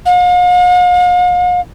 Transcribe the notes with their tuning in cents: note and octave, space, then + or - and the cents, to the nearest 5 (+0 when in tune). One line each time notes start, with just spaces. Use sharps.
F5 +45